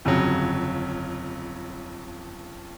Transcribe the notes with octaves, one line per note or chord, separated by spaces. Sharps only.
G1 F2 C#3 F#3